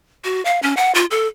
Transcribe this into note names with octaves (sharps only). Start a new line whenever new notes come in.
F#4
F5
C#4
F#5
F4
A4